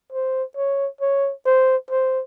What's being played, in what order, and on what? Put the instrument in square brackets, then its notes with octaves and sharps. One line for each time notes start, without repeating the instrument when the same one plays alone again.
[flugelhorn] C5
C#5
C#5
C5
C5